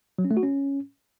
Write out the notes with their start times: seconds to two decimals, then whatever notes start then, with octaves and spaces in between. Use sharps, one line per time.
0.18 F#3
0.25 C#4
0.31 A3
0.37 F#4
0.43 C#4